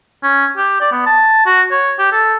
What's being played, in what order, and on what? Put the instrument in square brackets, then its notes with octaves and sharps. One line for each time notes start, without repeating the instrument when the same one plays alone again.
[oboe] C#4
G4
D5
B3
A5
F#4
C#5
G4
A4